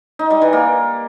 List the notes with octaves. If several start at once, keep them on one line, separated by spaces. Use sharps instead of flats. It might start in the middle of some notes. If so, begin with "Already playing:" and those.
D#4
G3
E3
A#3